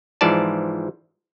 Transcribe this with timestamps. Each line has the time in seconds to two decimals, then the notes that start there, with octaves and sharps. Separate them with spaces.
0.21 G#2 E3 F3 D5 A5